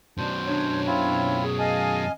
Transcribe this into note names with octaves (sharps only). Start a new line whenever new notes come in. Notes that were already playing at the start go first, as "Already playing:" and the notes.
F#2 B2 D4 C5
D4 C#5
C4 E4 F4
G#4
D#5 F5 G#5 A5